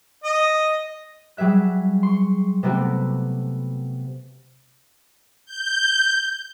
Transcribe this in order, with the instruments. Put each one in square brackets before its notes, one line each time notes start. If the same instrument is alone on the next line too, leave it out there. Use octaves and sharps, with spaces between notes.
[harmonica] D#5
[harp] F#3 G3 G#4 E5 F#6
C6 C#6
C3 A3 B3 C4 F#4 G4
[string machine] G6